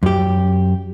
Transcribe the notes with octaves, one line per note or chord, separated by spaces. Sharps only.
F#2 G4